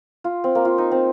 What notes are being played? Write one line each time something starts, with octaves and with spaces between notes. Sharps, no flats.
F4
C4
A#3
F4
D#4
C4